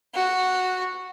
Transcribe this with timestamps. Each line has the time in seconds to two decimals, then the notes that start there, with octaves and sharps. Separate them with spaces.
0.14 F#4